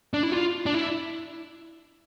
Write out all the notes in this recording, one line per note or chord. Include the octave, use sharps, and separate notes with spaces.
D4
E4
F4
D4
E4